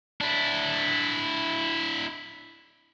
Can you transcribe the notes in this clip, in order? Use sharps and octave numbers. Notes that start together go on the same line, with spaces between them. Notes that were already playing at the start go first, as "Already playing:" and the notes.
D4 E4